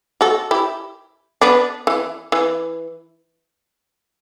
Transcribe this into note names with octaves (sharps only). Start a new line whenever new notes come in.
F#4 A4
E4 G4
B3 D4
E3
E3